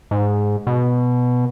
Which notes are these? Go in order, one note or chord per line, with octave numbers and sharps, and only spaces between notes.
G#2
B2